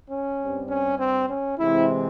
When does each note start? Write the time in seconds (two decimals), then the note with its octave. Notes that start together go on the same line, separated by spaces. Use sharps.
0.10 C#4
0.40 G2 G3 C4
0.69 C#4
0.99 C4
1.29 C#4
1.59 C3 E3 G#3 C4 E4